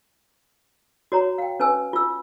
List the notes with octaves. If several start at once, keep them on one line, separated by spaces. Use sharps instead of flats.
F#4 C#5 A#5
F5 G5
C#4 B4 G#5 E6
F4 E6